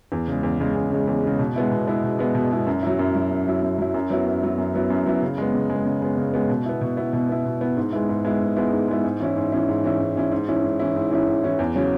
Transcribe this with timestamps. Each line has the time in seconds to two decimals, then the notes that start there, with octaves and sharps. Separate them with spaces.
0.12 E2
0.28 C#3 G#3
0.43 E2
0.60 C#3 G#3
0.75 E2
0.92 C#3 G#3
1.07 E2
1.23 C#3 G#3
1.39 B2
1.56 G#3 B3 E4
1.71 B2
1.87 G#3 B3 E4
2.03 B2
2.19 G#3 B3 E4
2.35 B2
2.51 G#3 B3 E4
2.67 F#2
2.83 F#3 E4
2.99 F#2
3.15 F#3 E4
3.31 F#2
3.47 F#3 E4
3.62 F#2
3.78 F#3 E4
3.94 F#2
4.10 F#3 B3 E4
4.27 F#2
4.42 F#3 B3 E4
4.58 F#2
4.74 F#3 B3 E4
4.90 F#2
5.06 F#3 B3 E4
5.22 C#3
5.38 G#3 B3
5.54 C#3
5.70 G#3 B3
5.85 C#3
6.02 G#3 B3
6.17 C#3
6.34 G#3 B3
6.49 B2
6.66 B3 E4
6.81 B2
6.97 B3 E4
7.13 B2
7.29 B3 E4
7.45 B2
7.61 B3 E4
7.77 G#2
7.92 G#3 B3 E4
8.09 G#2
8.25 G#3 B3 E4
8.41 G#2
8.56 G#3 B3 E4
8.72 G#2
8.88 G#3 B3 E4
9.04 G#2
9.20 E3 C#4 E4
9.36 G#2
9.52 E3 C#4 E4
9.68 G#2
9.84 E3 C#4 E4
10.00 G#2
10.16 E3 C#4 E4
10.31 G#2
10.48 E3 C#4 E4
10.64 G#2
10.80 E3 C#4 E4
10.96 G#2
11.11 E3 C#4 E4
11.27 G#2
11.43 E3 C#4 E4
11.59 E2
11.75 C#3 F#3 C#4